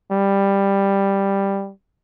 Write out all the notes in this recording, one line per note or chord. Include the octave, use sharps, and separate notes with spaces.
G3